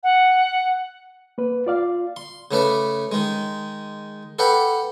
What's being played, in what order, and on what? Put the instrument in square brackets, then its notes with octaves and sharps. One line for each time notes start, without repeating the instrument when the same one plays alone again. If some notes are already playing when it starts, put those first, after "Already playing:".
[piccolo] F#5
[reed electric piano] A#3 B4
F4 D5 F5
[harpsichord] C6
C#3 A3 B4 D5
D#3 G#3
A4 B4 D5 F#5 G5 B5